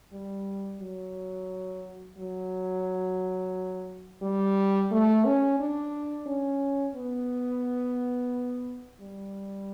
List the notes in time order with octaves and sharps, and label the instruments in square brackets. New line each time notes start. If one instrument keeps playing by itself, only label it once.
[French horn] G3
F#3
F#3
G3
A3
C#4
D4
C#4
B3
G3